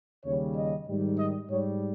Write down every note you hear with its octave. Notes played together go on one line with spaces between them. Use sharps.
D#2 C#3 G3 C#5
D#5
G#2 D#3 G3
D#5
G#2 G3 C#5